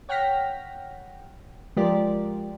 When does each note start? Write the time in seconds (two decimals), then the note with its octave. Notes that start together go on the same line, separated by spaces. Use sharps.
0.09 C#5 F#5 G5 F6 A#6 B6
1.76 F3 G#3 F4 G4 A#4 D5